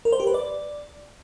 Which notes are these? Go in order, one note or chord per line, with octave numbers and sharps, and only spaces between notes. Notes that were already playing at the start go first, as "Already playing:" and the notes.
A#4
C5
G4
B4
D5